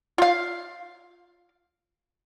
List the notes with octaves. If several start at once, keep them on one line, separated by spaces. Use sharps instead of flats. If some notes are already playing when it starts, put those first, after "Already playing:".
F4 F5